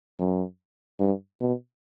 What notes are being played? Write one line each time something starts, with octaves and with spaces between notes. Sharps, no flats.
F#2
G2
B2